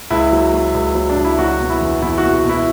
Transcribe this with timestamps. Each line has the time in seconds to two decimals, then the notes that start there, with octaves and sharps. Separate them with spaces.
0.10 C#2 E4
0.32 F#3
0.54 F#3
0.74 C#2
0.95 F#3
1.09 D4
1.16 C#2
1.25 E4
1.39 F#3 F#4
1.60 B2
1.70 E4
1.81 E2
2.02 E2 E4
2.18 F#4
2.23 B2
2.34 F#4
2.44 B2
2.49 E4